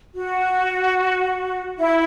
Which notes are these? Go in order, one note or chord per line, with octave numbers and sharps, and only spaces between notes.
F#4
E4